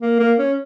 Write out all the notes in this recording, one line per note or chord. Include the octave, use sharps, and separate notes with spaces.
A#3
A#3
C#4